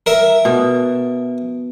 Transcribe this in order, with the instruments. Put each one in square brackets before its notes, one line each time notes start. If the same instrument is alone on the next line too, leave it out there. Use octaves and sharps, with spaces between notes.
[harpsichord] A#4 E5
[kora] B2